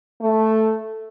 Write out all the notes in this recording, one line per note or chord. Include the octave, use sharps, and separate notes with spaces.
A3